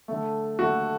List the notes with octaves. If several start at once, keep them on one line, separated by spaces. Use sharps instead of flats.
D3 A3
D3 A3 F#4